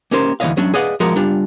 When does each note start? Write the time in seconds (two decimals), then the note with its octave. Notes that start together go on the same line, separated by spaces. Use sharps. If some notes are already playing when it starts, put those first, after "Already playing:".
0.11 A#3 C#4 G4 A#4 C5
0.40 D2 E3 C#4 C#5 D#5 F5
0.57 F#3 C#4 D4
0.74 G#4 B4 D5 D#5 F5 F#5
1.00 F3 G#3 F#4 G4 A#4
1.16 G3 D4 F4